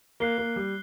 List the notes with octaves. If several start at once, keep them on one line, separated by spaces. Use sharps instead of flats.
A#3 F#6 C7 G7
A#3
G3